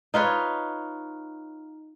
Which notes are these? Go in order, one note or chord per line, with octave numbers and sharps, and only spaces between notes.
D#4 F4 B4 C#5